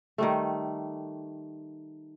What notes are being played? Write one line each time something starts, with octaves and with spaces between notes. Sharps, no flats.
D#3 G3 A3